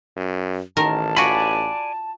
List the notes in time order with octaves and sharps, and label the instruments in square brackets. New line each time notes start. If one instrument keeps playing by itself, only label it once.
[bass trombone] F#2
[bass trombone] A1 [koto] D#3 A#4 [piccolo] A5
[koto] F4 F#4 [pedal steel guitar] D5 G#5 B5